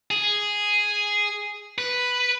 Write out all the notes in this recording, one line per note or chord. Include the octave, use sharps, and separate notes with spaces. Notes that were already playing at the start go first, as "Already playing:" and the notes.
G#4
B4